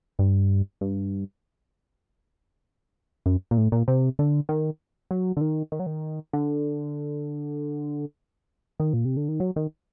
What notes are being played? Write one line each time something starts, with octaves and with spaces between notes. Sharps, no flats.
G2
G2
F#2
A#2
A2
A#2
C3
D3
D#3
F#3
D3
D#3
D#3
F#3
D#3
D3
D#3
A#2
C3
D3
D#3
F#3
D#3